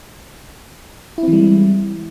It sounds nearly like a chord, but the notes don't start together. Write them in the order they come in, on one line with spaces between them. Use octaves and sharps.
E4 C4 E3 G3 G#3